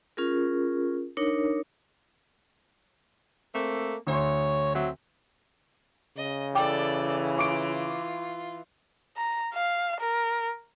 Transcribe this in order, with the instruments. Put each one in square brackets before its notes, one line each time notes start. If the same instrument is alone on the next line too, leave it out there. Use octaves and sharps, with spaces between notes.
[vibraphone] C#4 F4 G#4 A#4
D4 D#4 A#4 C#5
[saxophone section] A3 A#3 C4
[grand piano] D2 C6 [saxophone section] C#5
[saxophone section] F#3 C4 E5
[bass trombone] C#3 [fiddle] D#5
[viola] E3 [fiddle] A4 D5 [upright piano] G5 D6
[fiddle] F4 [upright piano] C#6 D6 D7
[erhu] A#5
F5
A#4